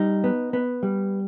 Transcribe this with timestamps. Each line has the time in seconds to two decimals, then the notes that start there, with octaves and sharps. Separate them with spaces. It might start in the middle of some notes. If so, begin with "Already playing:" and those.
Already playing: G3 D#4
0.24 B3
0.53 B3
0.83 G3